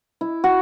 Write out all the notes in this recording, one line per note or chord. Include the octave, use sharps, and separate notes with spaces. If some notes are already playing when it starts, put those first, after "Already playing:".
E4
F#4